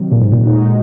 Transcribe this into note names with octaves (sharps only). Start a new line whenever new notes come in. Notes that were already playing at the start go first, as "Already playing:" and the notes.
Already playing: C3 D#3 F#3
A#2
G#2
A#2
G#3 D#4 F#4